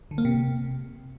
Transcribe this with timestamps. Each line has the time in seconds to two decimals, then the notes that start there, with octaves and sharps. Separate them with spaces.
0.11 D3
0.18 A#3
0.25 C3